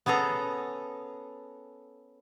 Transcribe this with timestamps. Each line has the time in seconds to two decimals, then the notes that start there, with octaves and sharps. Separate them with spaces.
0.06 B3 C#4 G#4 A4 A#5